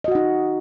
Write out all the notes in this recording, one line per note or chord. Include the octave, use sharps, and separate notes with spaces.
D#4 F#4 D#5 F#5